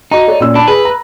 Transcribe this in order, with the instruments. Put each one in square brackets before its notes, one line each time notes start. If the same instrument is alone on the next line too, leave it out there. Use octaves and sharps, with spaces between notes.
[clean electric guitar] D#4 [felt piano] F#4 D#5 A#5
[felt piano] A4 C#5 D5
A#2 C#4 E6
[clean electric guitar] D4 [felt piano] B5
[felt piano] G#4 [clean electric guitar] B4
[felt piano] A#5